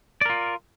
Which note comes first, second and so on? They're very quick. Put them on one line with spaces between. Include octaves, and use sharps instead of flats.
D5 A#4 F4